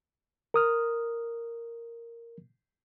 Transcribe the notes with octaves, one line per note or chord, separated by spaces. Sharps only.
A#4 D#6 F6